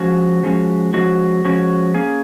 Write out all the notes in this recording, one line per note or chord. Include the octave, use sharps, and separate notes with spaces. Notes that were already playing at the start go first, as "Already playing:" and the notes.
Already playing: F3 G#3 C#4 F#4
F3 G#3 C#4 F#4
F3 G#3 C#4 F#4
F3 G#3 C#4 F#4
A#3 C#4 G#4